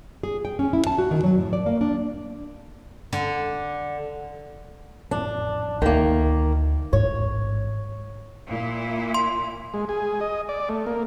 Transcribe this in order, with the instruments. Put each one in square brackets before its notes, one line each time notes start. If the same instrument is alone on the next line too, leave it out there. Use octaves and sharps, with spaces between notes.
[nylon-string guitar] G#4
G5
C#4
E4
A5
F#4
D#3
F#3
A2
D5
A#3
D4
[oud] D3
[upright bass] A1 F2 [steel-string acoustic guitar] D4
[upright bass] D2 [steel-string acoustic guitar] D#3 A#3
[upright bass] A1 G#2 [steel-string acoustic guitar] C#5
[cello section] A#2 E4
[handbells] C6
[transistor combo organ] G#3
G#4
D#5
D5
A3
A#3